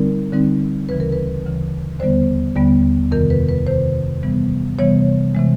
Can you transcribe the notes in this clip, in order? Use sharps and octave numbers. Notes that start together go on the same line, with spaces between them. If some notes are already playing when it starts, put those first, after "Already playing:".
Already playing: D3 G3 C4 D#4 A#4
D3 G3 C4 D#4
D2 C#3 E3 B4
A#4
B4
D2 C#3 E3
D#2 D3 G3 B3 C5
D#2 D3 G3 B3
F2 C3 D#3 A#4
B4
B4
F2 C3 D#3 C5
C3 E3 G3 B3
C3 E3 G3 B3 C#5
C3 E3 G#3